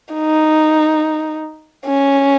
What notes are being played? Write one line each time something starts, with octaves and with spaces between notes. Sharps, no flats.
D#4
C#4